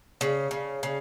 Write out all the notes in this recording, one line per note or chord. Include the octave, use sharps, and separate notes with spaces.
C#3
C#3
C#3